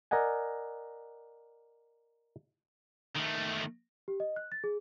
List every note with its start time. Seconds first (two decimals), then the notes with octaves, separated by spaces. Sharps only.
0.11 A#4 D5 D#5 F#5 G#5
3.16 D#3 A3
4.08 G4
4.20 D#5
4.36 F#6
4.52 A6
4.64 G#4